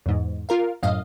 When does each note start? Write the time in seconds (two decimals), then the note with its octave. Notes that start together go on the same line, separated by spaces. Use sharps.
0.06 E2 G#2
0.49 F4 A#4 F5
0.83 F#2 A2 D#5 F5